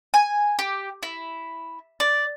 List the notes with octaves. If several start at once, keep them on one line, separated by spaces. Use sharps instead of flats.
G#5
G4
E4
D5